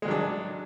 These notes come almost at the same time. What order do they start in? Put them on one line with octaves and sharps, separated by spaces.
G#3 D#3 F#3 D4